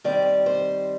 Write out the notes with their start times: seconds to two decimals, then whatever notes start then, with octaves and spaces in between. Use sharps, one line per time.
0.04 D#3 G3 C4 D5
0.46 C5